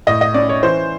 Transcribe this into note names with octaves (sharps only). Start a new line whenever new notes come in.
A2 D#5
D#5
C#4 D5
C#5
E3 C5